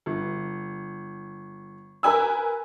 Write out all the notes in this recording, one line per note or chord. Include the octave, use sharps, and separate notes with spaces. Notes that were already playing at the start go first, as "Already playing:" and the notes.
G1
A#4 B4 G#5 E6